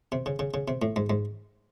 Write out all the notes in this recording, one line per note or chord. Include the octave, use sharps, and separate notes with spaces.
C3
C#3
C#3
C#3
C3
A2
G#2
G#2